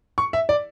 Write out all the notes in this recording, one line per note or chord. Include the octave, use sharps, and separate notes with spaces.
C#6
E5
D5